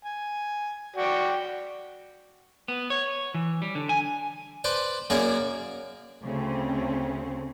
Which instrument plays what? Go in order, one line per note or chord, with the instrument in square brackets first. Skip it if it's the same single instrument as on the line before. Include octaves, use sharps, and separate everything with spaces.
[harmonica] G#5
F#4 D5 G5
[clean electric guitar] B3
C#5
E3
G3
D3
G#5
[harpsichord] B4 C5 D5 A5
F#2 A#3 G#4 C#5 D5 A#5
[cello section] D2 C#3 C4